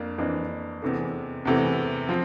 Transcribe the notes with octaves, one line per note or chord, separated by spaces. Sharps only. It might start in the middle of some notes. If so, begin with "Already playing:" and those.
Already playing: F2 A#3 D4
F2 E3 A#3 D4
E2 C3 E3 A3
E2 C3 E3 A3
F3 C4